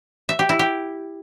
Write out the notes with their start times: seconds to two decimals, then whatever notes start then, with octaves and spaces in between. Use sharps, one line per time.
0.29 E5
0.39 G4
0.49 E4
0.59 G4